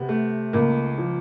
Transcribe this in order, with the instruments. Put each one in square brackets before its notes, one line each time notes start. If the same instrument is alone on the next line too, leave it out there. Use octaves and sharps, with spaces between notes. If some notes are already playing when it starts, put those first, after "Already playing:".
Already playing: [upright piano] C3 [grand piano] B3
[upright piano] A3
[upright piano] C#2 [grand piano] A#3
[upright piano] F3